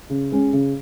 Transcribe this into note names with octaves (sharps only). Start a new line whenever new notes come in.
C#3
G#3 C#4
C#3